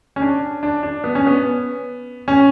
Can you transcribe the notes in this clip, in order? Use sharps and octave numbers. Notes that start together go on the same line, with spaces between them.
C#4
D4
D4
D4
B3
C#4
B3
C#4